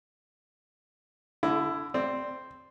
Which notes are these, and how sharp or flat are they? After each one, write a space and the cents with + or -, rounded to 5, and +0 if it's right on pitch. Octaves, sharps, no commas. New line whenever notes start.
D3 -20 E4 +15
C4 +0 D5 +0